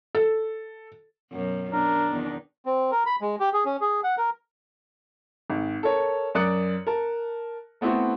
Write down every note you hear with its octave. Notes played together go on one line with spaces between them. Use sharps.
A4
F#2 B2
B2 D4 A#4
E2 D#3 D#4
C4
A#4
B5
G#3
G4
G#4
C#4
G#4
F#5
A#4
G#1
A4 A#4 C#5
F#2 A#4 D5 D#6 F#6 C#7
A#4 A5
A3 B3 C4 E4 F#4